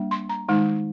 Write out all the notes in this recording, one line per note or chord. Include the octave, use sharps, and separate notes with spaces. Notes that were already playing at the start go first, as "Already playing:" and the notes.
Already playing: G3 A#3 D4
C6
A#5
D#3 G#3 D#4